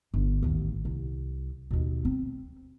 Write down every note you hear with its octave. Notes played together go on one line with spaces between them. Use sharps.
G1
A1 D#2
C2
D#2 B2
C4